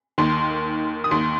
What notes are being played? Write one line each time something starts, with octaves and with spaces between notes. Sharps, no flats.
D#2 D#3 C6
D#6
D#2 D#3 C6